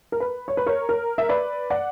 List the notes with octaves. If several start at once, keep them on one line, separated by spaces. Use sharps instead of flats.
A#4
B4
C#5
B4
A#4 C#5
A#4
E5
B4 D5
D5 F#5